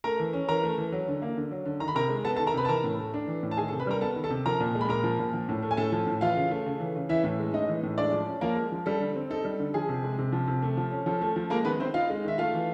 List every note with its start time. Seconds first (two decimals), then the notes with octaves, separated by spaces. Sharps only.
0.04 A3 A#4 A#5
0.20 E3
0.33 C#4
0.48 E3 A#4 A#5
0.63 A3
0.78 E3
0.92 F#3
1.08 D3
1.22 A#3
1.37 D3
1.51 F#3
1.66 D3
1.80 D#3 A#5
1.88 B5
1.95 C3 A#4 A#5
2.10 G#3
2.25 B3 A4 A5
2.36 A4 A5
2.39 D#3
2.47 A#4 A#5
2.54 C3 B4 B5
2.65 A5
2.68 E3 A#4 A#5
2.84 A2
2.98 A3
3.14 D4
3.27 E3
3.43 A2
3.51 A5
3.57 D#3 G#4 G#5
3.68 A4 A5
3.72 C3
3.80 B4 B5
3.87 G3 A#4 A#5
4.01 B3 A4 A5
4.16 D#3
4.24 A4 A5
4.30 C3
4.46 F3 A#4 A#5
4.60 A#2
4.75 G#3
4.81 B5
4.89 A#2 A#4 A#5
5.04 F3
5.19 A#2
5.34 F3
5.49 A2
5.62 A3
5.71 G#5
5.77 A2 A4 A5
5.92 F3
6.07 A2
6.21 E3 F4 F5
6.36 C#3
6.51 A3
6.66 C#3
6.80 E3
6.96 C#3
7.09 E3 E4 E5
7.24 A2
7.39 G#3
7.53 A2 D#4 D#5
7.69 E3
7.83 A2
7.98 G#3 D4 D5
8.13 F3
8.27 C#4
8.41 F3 A#3 A#4
8.56 G#3
8.72 F3
8.86 G3 A4
9.00 D3
9.16 C4
9.30 D#4 A4
9.45 G3
9.59 D3
9.74 F3 G#4
9.89 C3
10.04 G#3
10.19 C3
10.33 F3
10.48 C3
10.62 A3
10.77 F3
10.91 C#4
11.06 F3 A4
11.21 A3
11.36 F3
11.50 G#3 A#3 A#4
11.64 D#3 B3 B4
11.80 C4 C5
11.94 D#4 F4 F5
12.10 G#3
12.24 D#3 E5
12.38 A3 F4 F5
12.54 E3